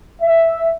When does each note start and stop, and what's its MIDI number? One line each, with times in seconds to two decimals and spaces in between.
0.22 0.71 76